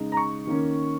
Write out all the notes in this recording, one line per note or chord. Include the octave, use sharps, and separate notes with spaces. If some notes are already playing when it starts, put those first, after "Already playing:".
Already playing: C#3 G#3 D#4
A#5
C#6
D#3 A#3 C#4